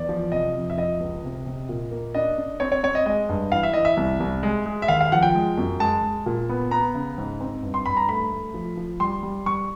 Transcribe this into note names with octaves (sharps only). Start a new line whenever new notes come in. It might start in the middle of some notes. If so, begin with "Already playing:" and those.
Already playing: E2 D5
F3
C3 D#5
F2
E5
F3 D#5
C#2
C3
C3
A#2
A#3
D4 D#5
D4
C4 C#5
C#5
C4 C#5
D#5
G#3 D#5
G2
E3 F5
E5
E3 D#5
E5
C2
C2
G#3
G#3
E5
D#2 F5
F5
F3 F#5
G5
G#3
F#2
G#3 A5
G#3
A#2
B3
B3 A#5
C#3
G#2
C4
G2
C6
G2 B5
A#5
A3 B5
A3
F3
F3
G3 C6
G3
G3 C#6